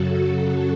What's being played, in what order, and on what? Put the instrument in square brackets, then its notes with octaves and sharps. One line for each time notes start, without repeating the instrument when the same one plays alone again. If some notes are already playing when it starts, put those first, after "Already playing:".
Already playing: [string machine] F#2 C#3 F#3 F#4 A4